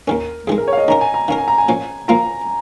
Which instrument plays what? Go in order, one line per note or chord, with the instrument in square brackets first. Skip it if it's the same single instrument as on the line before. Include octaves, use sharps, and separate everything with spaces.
[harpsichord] D#2 D#3 C#4 [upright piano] A#4
[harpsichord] F2 D#3 G#3 [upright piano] G#4
[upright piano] A#4
C#5
F5
D#5
[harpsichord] D#3 C#4 A#4 [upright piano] A#5
[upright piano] G#5
A#5
[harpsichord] D#3 C#4 A#4 [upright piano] F5
[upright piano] G#5
A#5
G#5
[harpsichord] A#2 F3 C#4
[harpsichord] A#2 F3 A#3 F4 [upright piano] A#5